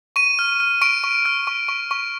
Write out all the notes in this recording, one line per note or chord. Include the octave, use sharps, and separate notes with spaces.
C#6 D#7
F6
F6
C#6 D7
C#6
F6
C#6
C#6
C#6